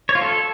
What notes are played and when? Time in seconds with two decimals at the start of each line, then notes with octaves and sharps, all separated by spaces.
0.09 C#5
0.15 F4
0.22 A4